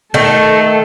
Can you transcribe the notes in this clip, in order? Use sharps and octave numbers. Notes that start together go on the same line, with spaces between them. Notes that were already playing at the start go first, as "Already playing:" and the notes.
D#3 A3 A4